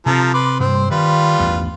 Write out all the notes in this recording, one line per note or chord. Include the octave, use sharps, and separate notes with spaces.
C3 F3 C4 A4 A#5
B4 C6 D6
G2 C3 G3 C4 C5
D#3 G3 F4 B4
A1 E2 G2